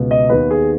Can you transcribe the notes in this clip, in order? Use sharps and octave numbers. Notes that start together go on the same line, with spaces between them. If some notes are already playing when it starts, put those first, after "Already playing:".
Already playing: C#2 B2 B3
D#5
D#2 D#3 B3 B4
G#4